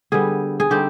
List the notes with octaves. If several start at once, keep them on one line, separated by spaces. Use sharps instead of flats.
D3 G3 B3 G#4
G#4
D3 G3 C4 D#4 G4